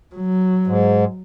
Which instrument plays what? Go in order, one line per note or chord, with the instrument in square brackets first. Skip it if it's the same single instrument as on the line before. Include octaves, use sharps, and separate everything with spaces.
[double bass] F#3
[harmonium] G#2